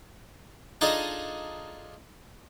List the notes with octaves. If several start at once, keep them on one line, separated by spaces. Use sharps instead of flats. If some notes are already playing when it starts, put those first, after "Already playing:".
D4 D#4 F4 G#4 A4 D#5